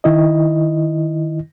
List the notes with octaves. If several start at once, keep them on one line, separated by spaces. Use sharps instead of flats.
D#3 E4 D#5